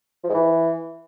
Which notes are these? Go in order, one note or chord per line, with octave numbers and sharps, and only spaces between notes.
F3
G#2
E3